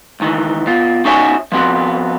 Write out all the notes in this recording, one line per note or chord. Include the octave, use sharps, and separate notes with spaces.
C#2 D#3 E3
B2 F4
C#4 D#4 F#4 C#5 E5 G#5
F3 B3 C4 F#4